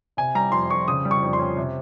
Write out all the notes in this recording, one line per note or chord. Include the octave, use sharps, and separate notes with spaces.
C3 G#5
G3 A#5
F2 C6
F2 C#6
C#3 D#6
G3
C#6
F2
C6
C#4
C3